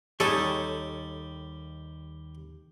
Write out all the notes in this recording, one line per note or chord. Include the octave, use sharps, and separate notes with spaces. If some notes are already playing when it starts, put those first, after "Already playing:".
D#2 G3 D#4 A4 C#5 G#5